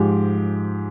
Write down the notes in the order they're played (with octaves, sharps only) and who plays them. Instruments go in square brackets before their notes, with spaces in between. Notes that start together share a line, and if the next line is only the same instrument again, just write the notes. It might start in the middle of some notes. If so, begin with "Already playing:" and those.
Already playing: [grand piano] G#2 F3 G#3 G4